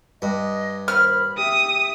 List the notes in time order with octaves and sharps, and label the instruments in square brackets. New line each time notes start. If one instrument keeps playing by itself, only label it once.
[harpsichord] G2 [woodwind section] D#5
[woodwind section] D#2 C5 B5 [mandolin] F6
[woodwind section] G4 E5 [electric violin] D#6